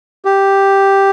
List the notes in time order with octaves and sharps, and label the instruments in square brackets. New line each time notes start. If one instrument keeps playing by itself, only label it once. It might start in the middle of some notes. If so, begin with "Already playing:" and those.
[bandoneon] G4